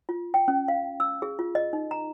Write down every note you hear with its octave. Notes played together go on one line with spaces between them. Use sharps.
F4
G5
C#4
F5
E6
G#4
F4
D#5
D#4
A#5